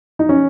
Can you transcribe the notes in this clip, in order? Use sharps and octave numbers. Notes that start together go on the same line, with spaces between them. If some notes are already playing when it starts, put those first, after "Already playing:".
D#4
C#4